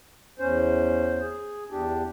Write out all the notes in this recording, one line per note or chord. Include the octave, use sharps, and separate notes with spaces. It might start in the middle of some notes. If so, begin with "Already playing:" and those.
E2 C#4 C5
G#4
E2 D4 G4